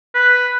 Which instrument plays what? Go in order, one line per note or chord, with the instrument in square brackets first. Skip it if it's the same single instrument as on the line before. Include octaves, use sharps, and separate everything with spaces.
[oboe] B4